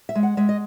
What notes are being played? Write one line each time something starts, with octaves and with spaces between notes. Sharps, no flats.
E5
G#3
F#5
G#3 E5
D#5